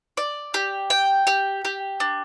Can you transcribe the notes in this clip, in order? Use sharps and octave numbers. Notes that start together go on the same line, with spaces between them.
D5
G4
G5
G4
G4
D4